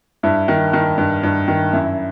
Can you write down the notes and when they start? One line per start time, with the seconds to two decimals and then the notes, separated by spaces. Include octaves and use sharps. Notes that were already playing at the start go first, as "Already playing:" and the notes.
0.23 G2 E4
0.48 D#3
0.73 D#3
0.98 G2
1.23 G2
1.48 D#3
1.73 F#2 E4